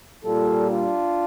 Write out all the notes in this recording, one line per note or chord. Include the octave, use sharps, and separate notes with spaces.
A#2 G3 F4 A4
D4 F4